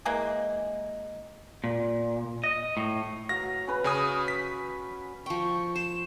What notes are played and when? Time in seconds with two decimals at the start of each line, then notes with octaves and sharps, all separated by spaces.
0.05 E3 G#3 A#3
1.64 A#2
2.44 D#5
2.77 A2
3.29 F#3 F5 A#6
3.67 C#4 B4 B5
3.84 C#3 G#5 D#6
4.28 B6
5.26 F3 G5 C#6
5.76 C5 E7